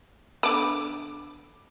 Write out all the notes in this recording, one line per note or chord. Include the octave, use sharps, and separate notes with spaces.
D3 B3 B5 D6